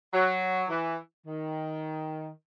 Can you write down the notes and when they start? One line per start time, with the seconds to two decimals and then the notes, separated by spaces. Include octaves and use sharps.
0.13 F#3
0.70 E3
1.26 D#3